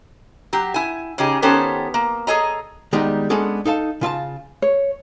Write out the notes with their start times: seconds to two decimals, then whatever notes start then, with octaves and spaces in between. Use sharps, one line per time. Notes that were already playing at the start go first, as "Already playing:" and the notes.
0.53 F#3 G4
0.74 E4 G#5
1.18 C#3 C#4 D#4 G4 G#4
1.42 D#3 B3 C#4 G4 A4 C5
1.94 A#3
2.27 G#4 A4 C#5 D#5 G#5 A#5
2.93 D#3 G3 G#3 B3 D#4 G4
3.30 G#3 B3 C#4 D4 G#4 A4
3.65 D#4 A4 F5 A5
4.01 C#3 F4 E5 A5
4.62 C#5